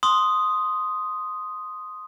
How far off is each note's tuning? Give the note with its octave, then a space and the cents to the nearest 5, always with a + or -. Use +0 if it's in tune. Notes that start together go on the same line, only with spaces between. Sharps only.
C6 +0 D#6 +0